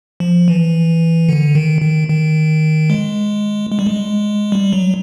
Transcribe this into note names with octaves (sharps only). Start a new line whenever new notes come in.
F3
E3
D3
D#3
D#3
D#3
G#3
G#3
G3
G#3
G3
F#3